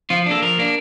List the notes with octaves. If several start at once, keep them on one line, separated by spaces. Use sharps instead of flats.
F3 F4
A#3 D4 A4
F3 A#4
A#3 D4